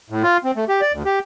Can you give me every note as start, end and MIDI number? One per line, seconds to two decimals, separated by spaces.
0.10 0.23 45
0.23 0.37 65
0.44 0.51 60
0.56 0.65 57
0.69 0.81 67
0.81 0.92 74
0.92 1.03 38
1.05 1.19 67